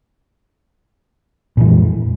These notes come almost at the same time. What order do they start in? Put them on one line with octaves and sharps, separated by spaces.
A#2 E3 F2 G#3